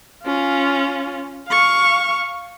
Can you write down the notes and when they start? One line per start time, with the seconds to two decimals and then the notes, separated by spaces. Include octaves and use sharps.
0.24 C#4 F4
1.48 F5 C#6